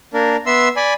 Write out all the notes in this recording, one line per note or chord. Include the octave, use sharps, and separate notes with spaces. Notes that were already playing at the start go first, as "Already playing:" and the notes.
A#3 D4 A#4
B3 E5 C6 E6
D5 G#5 B5